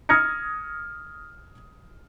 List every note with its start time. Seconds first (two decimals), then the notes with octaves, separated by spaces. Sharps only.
0.09 D#6 F6 G#6 A#6 C#7